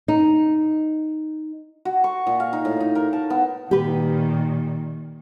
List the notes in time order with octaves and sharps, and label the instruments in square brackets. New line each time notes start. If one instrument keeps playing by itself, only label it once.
[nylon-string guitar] D#4
[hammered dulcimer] F#4
C#6
A#2
F5
D#4
A2
D#4
A#4
A5
B3
[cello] A#2 D#3 [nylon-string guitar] G4 B4